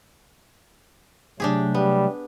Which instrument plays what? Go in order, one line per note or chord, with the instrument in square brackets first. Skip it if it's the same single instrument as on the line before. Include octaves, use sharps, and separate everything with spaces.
[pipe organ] C3 F#3 A3 [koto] D4 G4 G#4
[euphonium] G3 [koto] B3